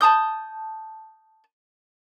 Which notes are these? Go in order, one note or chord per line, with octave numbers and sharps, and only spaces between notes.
A5 A#5 D#6 G6